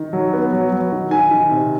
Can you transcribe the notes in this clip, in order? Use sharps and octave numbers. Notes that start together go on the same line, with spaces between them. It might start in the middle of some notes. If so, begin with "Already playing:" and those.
Already playing: D#3
F#3
B3
F#3
F#3
D#3
D#3 G#5
D#3
C3